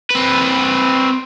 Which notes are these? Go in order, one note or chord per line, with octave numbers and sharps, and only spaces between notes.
C4 B4